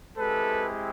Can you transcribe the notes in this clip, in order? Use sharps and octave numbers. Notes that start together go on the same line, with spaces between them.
G#3 C4 E4 G4 A4 B4